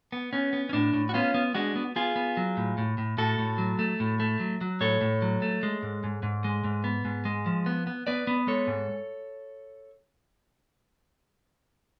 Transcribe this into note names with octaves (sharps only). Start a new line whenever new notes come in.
B3
B3 C#4
B3
C#4
A2 D4
A2
F#4
B3 C#4 F4
B3
G#3 D4 F#4
B3
B3 F4 G#4
B3
F#3
A2
A2
A2
A2 F#4 A4
A2
F#3
A3
A2
A3
F#3
F#3
A2 A4 C#5
A2
F#3
A3
G#3
G#2
G#2
G#2
G#3
G#2
B3
G#2
G#3
F3
B3
B3
B3 B4 D5
B3
G#3 A4 C#5
G#2